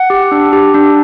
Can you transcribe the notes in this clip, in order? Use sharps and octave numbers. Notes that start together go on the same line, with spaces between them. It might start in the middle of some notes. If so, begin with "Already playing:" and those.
Already playing: F#5
G4
D4
G4
D4